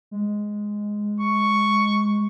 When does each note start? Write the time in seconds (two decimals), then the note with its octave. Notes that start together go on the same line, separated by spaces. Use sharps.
0.11 G#3
1.21 C#6